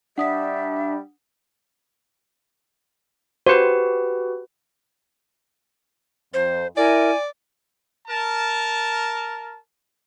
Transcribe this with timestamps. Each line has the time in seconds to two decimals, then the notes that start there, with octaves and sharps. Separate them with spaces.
0.18 G3 D4 E5 F#5 D#6 B6
3.47 F#4 G4 B4 C5
6.34 F2 C5
6.77 E4 A#4 D5 G#5
8.08 A#4 A5